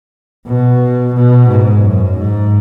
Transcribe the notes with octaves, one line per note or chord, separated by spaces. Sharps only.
B2
B2
G#2
F#2
G#2